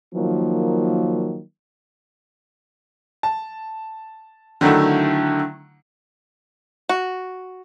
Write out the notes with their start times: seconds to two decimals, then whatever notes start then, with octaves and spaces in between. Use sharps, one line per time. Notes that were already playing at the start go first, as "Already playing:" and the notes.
0.15 D#3 F3 F#3 A#3
3.23 A5
4.61 D3 D#3 F#3 A3 E4
6.89 F#4